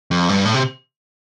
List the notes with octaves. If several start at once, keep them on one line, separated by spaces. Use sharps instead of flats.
F2
G2
A2
C3